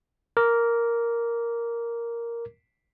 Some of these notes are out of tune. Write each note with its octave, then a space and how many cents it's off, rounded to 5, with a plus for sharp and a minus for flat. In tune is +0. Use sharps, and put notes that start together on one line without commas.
A#4 +0 D6 -20